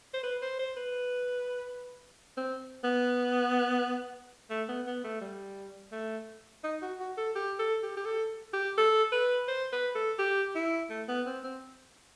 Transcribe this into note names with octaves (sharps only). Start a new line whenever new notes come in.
C5
B4
C5
C5
B4
C4
B3
A3
B3
B3
A3
G3
A3
D#4
F#4
F#4
A4
G4
A4
G4
G4
A4
G4
A4
B4
C5
B4
A4
G4
E4
A3
B3
C4
C4